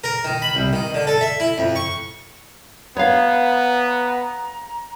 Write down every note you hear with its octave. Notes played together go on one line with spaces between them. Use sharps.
A#4
D#3
B5
C2
D#3
D3
A4
E5
E4
F2
C#6
B3 C#5 F5 A#5